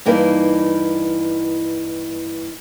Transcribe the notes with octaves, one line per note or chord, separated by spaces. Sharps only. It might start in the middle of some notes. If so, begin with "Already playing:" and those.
G2 E3 A#3 D#4